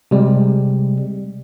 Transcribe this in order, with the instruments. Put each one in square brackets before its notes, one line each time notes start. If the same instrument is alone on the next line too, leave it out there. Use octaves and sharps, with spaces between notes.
[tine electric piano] C3 G3 G#3